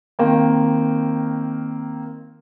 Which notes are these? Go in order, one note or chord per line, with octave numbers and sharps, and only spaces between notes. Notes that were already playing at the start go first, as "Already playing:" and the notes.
D#3 A#3 C4